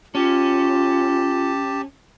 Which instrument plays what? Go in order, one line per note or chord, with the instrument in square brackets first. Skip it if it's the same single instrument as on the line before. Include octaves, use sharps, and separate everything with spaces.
[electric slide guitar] C#4 [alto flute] F4 [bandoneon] G4 A5